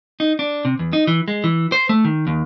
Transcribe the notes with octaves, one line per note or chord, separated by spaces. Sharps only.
D#4
D4
C3
E2
D#4
E3
G#3
E3
C5
A3
D#3
D#2